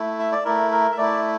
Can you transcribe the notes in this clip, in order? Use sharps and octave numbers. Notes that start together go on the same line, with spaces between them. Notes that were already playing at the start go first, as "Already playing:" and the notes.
Already playing: A3 E4
E5
D5
A3 E4 A#4
A#4
E5
A3 E4 D5